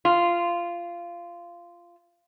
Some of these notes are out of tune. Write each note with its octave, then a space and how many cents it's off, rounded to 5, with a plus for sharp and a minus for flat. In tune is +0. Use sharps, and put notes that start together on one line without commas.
F4 -15